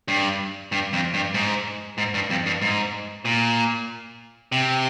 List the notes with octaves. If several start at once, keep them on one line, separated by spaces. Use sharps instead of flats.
G2
G2
F2
G2
G#2
G#2
G2
F2
G2
G#2
A#2
C3